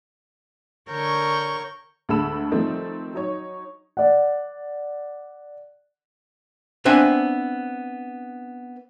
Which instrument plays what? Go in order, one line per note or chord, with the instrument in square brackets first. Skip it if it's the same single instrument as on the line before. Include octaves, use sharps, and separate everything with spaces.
[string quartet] D3 A#4 C#5 C#6 G6
[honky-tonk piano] D2 G#3 A4 B5 E6 E7
D#3 F3 G3 A3 C4 D#4
F#3 D#4 C#5
[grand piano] D5 F#5
[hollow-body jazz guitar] B3 C4 D4 C5 E5 G#5